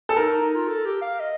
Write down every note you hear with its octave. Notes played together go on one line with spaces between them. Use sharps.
A4
D#4 A#4
D#4
D#4
F4
A4
G4
F5
D#5